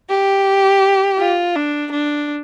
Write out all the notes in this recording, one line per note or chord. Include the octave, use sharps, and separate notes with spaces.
G4
F4
D4
D4